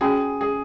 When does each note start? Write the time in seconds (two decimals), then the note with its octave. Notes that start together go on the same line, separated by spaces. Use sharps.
0.01 C#4 F#4 G#4 C#5 G#5
0.41 G#4